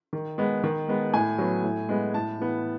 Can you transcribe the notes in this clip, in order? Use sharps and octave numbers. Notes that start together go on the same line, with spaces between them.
D#3
G#3 B3
D#3
G#3 B3
A2 G#5
F#3 B3
A2
G#3 B3
A2 A5
E3 B3